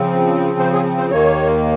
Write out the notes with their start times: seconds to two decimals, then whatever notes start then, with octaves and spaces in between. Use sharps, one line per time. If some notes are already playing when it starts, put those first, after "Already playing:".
Already playing: C#3 F3 C4
0.59 C5
0.73 G#4
0.98 C5
1.11 D#2 D#3 A#3 C#5